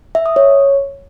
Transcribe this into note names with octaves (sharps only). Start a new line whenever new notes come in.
E5
D#6
C#5